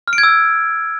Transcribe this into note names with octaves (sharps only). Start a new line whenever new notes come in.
F6
D7
G#6
E6
G#6